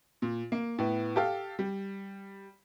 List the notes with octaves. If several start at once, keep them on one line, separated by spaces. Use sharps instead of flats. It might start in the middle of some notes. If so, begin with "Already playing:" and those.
A#2
A#3
A2 B3
G4 A4 F5
G3